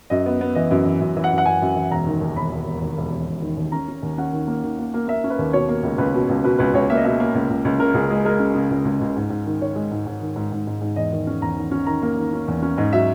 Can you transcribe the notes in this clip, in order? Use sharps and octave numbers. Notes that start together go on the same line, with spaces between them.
F#2 D#5
B3
B3
E3 D#5
F#2
E3
F#2
E3
F#5
F#2
F#5
F#2 G#5
F#2
E3
E1 A#5
D#3
D#2
E1 B5
E1
E1
D#2
E1
E1
E1
D#3
D#2
C#4 A#5
C#4
D#2
C#4 F#5
D#3
A#3
D#3
A#3
A#3
A#3 E5
C#4
B4
D#2
B2 C#5
A#3
C#2
C#2 B4
B2
C#2
B2 B4
C#2 B4
C#2 C#5
A#3 E5
D#5
B2 E5
A#3
C#2
C#2
C#2
C#3 A#4
C#2 G#4
G#3 G#4
G#3 A#4
C#3
C#3
C#2
C#2
C#2
G#2
G#2
D#3
D#3 C#5
G#3
G#2
G#2
D#3
G#2
G#2
G#2
G#2
E2 D#5
D#3
C#4
E2 A#5
D#3
C#4
D#3 A#5
A#3
D#3
C#4
E2
C#4
G#2 D#5
F#3 E5